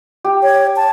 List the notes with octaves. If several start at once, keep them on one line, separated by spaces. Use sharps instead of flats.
G4
C#5
A5